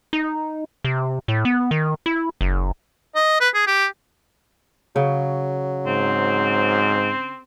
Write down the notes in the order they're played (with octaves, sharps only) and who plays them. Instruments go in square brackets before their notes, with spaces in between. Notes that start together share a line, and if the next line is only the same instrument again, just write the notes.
[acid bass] D#4
C3
A2
B3
D#3
E4
F#1
[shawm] D#5
B4
G#4
G4
[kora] C#3 [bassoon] F#3
[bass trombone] G#2 [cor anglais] C4